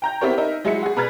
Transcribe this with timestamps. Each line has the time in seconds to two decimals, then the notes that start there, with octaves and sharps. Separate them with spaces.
0.02 G5 A#5 G6
0.21 B3 C4 E4 G4 A#4 C#5
0.38 D#4 A#4 E5
0.65 F#3 G#3 E4 G#4 E5 C#7
0.83 F#4 G#4
0.96 B2 B4 A#5 F6 G#6 A6